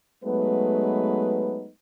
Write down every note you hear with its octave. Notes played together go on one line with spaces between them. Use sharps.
F#3 G#3 A3 B3 D#4 B4